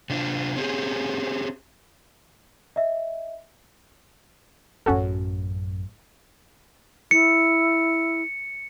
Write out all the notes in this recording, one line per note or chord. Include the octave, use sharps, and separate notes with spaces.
C3 D4 F4
C4 C#4 G4 G#4
D#5 E5
A1 F#2 C#4 F#4 A4
E4 C#7